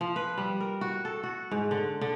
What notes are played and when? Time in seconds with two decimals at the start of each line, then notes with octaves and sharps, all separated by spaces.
0.01 F3
0.16 B4
0.38 G3
0.60 A#4
0.81 F#4
1.05 A4
1.23 F#4
1.51 G#2
1.71 D3
2.01 D3